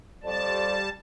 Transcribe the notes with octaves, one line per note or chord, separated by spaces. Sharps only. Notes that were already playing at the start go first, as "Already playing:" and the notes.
F2 G3 D5 A5